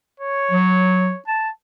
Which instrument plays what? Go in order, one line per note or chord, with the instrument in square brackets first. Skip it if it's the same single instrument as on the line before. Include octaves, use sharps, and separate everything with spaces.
[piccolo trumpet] C#5
[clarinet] F#3
A5